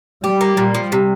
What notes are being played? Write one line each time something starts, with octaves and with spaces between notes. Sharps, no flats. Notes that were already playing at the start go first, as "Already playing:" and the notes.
G3 G4
A#3
A#2 G3
F3
C3